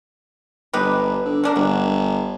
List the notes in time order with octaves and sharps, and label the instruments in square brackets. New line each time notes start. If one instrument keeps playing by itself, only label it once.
[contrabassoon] G1 [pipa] D#4 G4 B4
[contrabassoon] D3
[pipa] C#4 D4 A#4
[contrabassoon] G1 [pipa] F#4